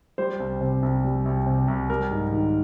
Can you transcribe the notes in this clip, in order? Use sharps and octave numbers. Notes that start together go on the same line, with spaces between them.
G3 C5
C2
C3
C2
G3
C2
C3
C2
G3 A#4
G#2
D#3